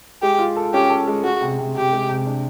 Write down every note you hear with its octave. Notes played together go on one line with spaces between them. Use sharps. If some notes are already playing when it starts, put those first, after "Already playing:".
G#3 G4
F4
A4
C#4 G4
A4
G#3
G#3 F#4
C3
C3
C3 G4
G#3
C3
D4